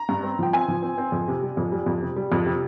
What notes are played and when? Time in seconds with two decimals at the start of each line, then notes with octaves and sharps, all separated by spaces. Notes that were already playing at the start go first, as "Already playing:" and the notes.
Already playing: A#5
0.09 G2
0.23 C4
0.39 F3 G5
0.53 C4 G#5
0.68 F3
0.83 C4
0.98 C4
1.12 F2
1.28 C3
1.42 G3
1.57 F2
1.72 G3
1.86 F2
2.02 C3
2.16 G3
2.32 F2
2.46 C3